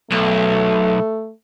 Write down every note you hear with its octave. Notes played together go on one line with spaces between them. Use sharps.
B1 A3